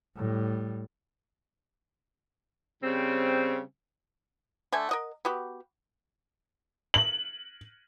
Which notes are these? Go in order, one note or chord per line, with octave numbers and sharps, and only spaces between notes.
A2 G3
C#3 G3 C4
D3 A3 G#5
A#4 D#5 F#5
B3 F#4 G4
F#7